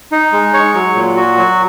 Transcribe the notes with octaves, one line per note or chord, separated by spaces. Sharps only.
D#4
G#3
C#5
F#3
A#2
F#4
F#3